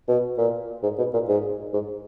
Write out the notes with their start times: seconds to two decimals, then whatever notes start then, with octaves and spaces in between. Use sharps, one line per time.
0.08 B2
0.38 A#2
0.83 G#2
0.98 B2
1.13 A#2
1.28 G#2
1.74 G#2